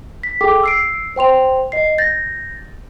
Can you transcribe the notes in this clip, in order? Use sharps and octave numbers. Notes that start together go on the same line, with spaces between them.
B6
G#4 A4 G5 D6
E6 C7 D7
C5 G5 C6 F7
D#5 C7
G6 A6 A#6